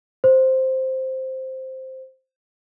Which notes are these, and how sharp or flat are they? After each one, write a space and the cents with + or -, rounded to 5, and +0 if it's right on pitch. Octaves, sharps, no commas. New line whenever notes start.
C5 +0